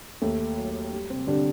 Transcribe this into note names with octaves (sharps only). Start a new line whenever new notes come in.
D#2 A3
F#3
G3
C3 C4
D3 G3 D4